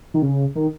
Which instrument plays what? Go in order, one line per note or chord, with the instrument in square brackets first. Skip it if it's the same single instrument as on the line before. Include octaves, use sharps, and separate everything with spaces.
[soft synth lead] D#3
C#3
D#3